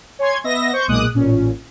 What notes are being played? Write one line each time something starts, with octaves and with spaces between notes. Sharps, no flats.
C#5 G#5 C6 G#6
B3 D#5 E5 A#6
C5 C#6 G6
B1 A#2 G#3 D6 D#6 F#6
A1 A#2 C#4